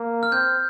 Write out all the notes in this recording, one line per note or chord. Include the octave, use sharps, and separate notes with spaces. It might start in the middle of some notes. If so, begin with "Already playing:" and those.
Already playing: A#3
F6
C4 G6